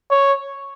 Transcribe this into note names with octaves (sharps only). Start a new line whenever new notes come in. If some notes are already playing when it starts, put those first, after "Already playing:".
C#5